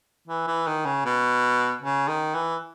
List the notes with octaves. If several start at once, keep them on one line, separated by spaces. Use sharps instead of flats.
E3
E3
D#3
C#3
B2
C#3
D#3
E3